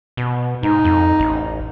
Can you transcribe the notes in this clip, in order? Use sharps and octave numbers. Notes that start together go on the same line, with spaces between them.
B2
G#2 D#4
F2
A1